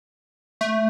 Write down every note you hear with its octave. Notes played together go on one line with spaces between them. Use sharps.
A3